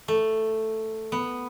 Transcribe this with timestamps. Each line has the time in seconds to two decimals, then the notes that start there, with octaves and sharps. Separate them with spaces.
0.08 A3
1.12 B3